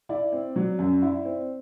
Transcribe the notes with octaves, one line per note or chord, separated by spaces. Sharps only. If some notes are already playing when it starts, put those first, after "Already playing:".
E4 D5
C4
F#3
F#2
E4
C4